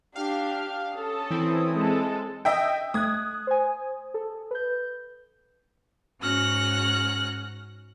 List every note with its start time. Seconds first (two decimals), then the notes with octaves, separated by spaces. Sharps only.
0.16 D4 G4 F5
0.96 C#4 A4 D#6
1.30 E3 C4 E4
1.73 G#3 A4
2.45 D#5 E5 G5
2.94 A3 D#6 F#6 G#6
3.47 C5 G#5
4.14 A4
4.51 B4 G6
6.22 G#2 C#4 F#4 F6 F#6 A#6